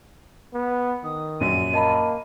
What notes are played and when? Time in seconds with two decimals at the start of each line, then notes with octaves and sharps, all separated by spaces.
0.54 B3
1.04 D#3 D#6
1.41 A#1 F#2 F#3 D#7
1.73 A#3 D#5 A5 B5